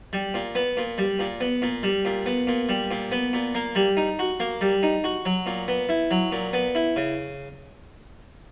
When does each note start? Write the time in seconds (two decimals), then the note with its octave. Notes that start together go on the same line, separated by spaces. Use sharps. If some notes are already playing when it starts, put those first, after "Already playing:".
0.13 G3
0.34 A#2
0.55 B3
0.77 A#2
0.98 G3
1.19 A#2
1.41 B3
1.62 A#2
1.83 G3
2.05 A#2
2.26 B3
2.47 A#2
2.69 G3
2.91 A#2
3.12 B3
3.33 A#2
3.55 A#3
3.75 G3
3.97 D#4
4.19 F#4
4.40 A#3
4.61 G3
4.83 D#4
5.04 F#4
5.25 F#3
5.46 A#2
5.68 B3
5.89 E4
6.11 F#3
6.32 A#2
6.53 B3
6.75 E4
6.96 C#3